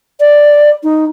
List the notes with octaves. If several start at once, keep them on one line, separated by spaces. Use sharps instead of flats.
D5
D#4